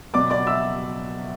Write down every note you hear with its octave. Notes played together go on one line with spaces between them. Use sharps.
B2 F#3 B3 D5 D6
D5 D6
E5 E6